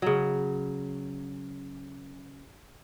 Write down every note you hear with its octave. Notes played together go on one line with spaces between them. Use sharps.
C#3 F#3